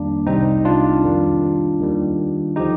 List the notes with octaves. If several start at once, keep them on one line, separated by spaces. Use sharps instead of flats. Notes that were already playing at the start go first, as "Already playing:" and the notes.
Already playing: F2 D#3 G3 A#3 D4
C2 C3 G3 C4 D#4
D4 F4
F2 D#3 G3
D#2 D#3 G3
D3 F3 D#4 G4